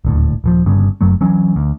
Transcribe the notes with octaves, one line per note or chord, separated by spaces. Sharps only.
D#1 D2 A2
D#1 E3 F3
G1 G2 C#3
F#1 F#2 F#3 A3
E3 F#3 C#4
D2